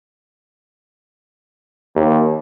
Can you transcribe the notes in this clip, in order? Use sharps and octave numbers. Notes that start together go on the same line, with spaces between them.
D#2